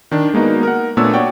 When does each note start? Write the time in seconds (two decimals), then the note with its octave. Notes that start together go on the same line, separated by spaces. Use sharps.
0.11 D#3 D4
0.34 G#3 A#3 B3 D#4 F#4
0.63 A#4 F#5
0.97 A#2 A3 B3 D4 C#5 E6
1.14 F#4 C#5 D5 F#5 G5